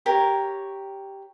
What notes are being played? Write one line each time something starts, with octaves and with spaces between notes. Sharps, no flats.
G4 A#4 C#5